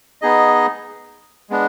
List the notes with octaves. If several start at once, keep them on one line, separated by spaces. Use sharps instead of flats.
B3 D#4 G#4 D#5
G#3 B3 D4